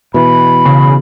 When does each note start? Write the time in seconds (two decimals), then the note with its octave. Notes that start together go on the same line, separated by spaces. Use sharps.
0.14 B2 E3 B5
0.65 C#3